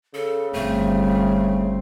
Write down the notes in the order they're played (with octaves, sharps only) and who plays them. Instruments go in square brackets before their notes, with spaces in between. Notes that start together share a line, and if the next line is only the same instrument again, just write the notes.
[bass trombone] C#3 [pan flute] A4
[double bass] G1 C4 [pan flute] A3